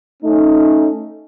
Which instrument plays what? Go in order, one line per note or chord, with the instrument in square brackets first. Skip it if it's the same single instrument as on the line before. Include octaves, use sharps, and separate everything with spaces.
[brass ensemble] A3 C#4 D#4